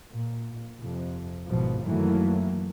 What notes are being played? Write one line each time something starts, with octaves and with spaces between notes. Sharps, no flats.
A#2
F2 C3
G#1 E2 B2 F3
F#2 D#3 E3 F#3 A3 A#3